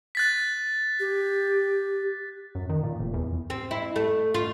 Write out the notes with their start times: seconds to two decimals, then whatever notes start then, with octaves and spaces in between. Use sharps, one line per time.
0.15 F#6 A6 B6
1.00 G4
2.55 F#2
2.69 D#3
2.83 A#2
2.99 F1
3.14 E2
3.50 C4
3.71 E4
3.96 A3
4.34 F4